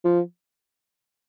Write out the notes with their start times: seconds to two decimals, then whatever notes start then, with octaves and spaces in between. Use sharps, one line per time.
0.05 F3